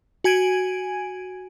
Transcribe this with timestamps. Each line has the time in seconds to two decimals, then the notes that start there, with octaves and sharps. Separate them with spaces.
0.24 F#4 G#5 G#6 D7 D#7